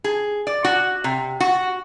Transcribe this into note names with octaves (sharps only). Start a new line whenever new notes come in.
G#4
D5
F#4
C3
F#4